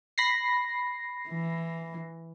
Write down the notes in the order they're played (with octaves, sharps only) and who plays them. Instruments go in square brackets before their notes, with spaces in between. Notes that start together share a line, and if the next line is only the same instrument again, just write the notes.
[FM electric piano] B5 A#6 C7
[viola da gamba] E3